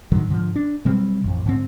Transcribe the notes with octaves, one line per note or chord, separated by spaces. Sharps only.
A2 D3 D#3 F#3
G#2 D3 D#3 F3
D4
B2 F#3 G3 C4
A1 F2
G#2 D3 C4